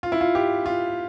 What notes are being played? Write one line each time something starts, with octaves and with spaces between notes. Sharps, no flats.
F4
E4
F4
G4
F4